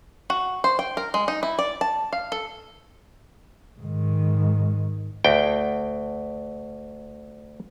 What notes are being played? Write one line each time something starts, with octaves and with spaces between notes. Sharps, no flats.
F#4
C5
G5
A#4
G#3
D#4
E4
D5
A5
F5
A4
G#2 D#3
D2 G5